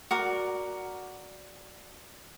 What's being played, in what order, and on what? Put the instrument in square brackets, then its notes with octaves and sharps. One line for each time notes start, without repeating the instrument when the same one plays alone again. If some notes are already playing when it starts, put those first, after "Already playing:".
[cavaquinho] F#4 A#4 D5